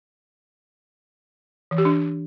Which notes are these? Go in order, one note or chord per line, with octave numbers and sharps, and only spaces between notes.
E3
G4
D4